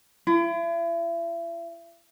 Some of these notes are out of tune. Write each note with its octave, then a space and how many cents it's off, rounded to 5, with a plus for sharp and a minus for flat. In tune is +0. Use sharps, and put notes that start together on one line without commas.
E4 +40